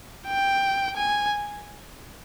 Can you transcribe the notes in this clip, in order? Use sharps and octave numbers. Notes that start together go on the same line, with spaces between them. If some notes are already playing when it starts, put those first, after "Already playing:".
G5
G#5